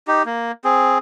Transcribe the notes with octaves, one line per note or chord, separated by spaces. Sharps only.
D#4 G4
A#3
C4 G#4